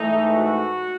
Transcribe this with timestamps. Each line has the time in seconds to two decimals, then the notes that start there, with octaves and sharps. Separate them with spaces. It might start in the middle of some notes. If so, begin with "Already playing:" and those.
Already playing: G#2 E3 A3 D#4
0.34 F#4